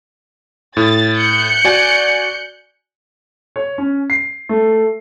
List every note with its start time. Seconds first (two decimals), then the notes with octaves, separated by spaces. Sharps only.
0.77 A2 A6
1.16 F#6 G6 C#7
1.65 F#4 D5 G#5
3.56 C#5
3.78 C#4
4.10 C7
4.49 A3